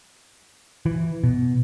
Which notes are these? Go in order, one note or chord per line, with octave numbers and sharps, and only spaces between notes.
E3
B2